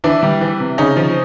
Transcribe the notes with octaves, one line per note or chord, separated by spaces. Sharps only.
E3 D4 E4
G3
E3
C3
C#3 C#4 D#4
F3